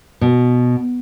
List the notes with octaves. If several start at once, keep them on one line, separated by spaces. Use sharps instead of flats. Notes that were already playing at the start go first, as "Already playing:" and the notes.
B2